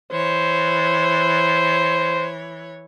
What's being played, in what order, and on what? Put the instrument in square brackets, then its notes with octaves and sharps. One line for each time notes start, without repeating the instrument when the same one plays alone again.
[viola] E3 C#5 [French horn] C5